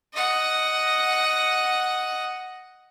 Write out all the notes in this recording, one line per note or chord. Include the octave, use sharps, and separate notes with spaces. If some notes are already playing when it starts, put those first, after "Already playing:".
D#5 F#5